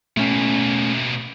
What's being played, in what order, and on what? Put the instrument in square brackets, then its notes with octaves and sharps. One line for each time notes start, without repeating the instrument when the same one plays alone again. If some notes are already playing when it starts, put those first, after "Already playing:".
[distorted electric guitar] B2 A#3 [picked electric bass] A3 C#4